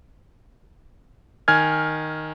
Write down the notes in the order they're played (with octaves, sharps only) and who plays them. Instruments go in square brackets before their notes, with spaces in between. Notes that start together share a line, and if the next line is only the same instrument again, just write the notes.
[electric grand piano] D#3 G#5 F6 G#6